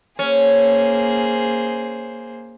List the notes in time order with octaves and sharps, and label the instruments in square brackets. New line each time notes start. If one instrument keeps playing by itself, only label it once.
[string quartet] A#3 G#4 C5 [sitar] C#4